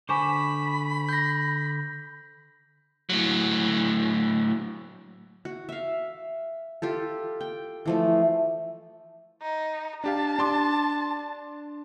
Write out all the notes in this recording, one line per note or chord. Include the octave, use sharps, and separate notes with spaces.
D3 C5 G#5 A5 B5 C#6 D6
G6 A#6
A2 F#3
F#4
E5 F5
F4 G4 A4
G5
E3 F3 A3
D#4
D4 G4 F5 A5
D4 C6 D6